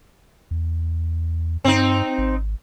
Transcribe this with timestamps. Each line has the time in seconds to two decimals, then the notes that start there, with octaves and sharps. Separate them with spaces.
0.51 E2
1.64 G2 C4 D#4
2.18 G#1